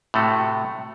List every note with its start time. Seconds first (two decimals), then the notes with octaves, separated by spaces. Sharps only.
0.14 A2 C3 A3 F#4